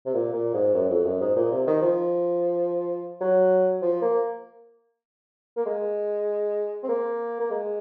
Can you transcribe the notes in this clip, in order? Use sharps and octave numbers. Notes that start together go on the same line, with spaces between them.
C3
A#2
A#2
G#2
F#2
F2
F#2
G#2
A#2
C3
D#3
F3
F#3
F3
A#3
A#3
G#3
C4
A#3
A#3
G#3